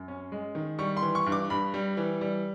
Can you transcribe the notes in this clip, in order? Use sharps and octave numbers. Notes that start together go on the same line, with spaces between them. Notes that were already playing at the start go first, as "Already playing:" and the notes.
Already playing: F#2
C#4
G#3
D#3
G3 C#6
C6
E3
C#6
G2
D6
G2 B5
G3
E3
G3